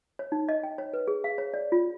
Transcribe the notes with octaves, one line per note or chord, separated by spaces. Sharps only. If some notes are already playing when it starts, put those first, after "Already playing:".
C#5
D#4
D#5
G5
C#5
B4
G#4
F5
C#5
D5
F4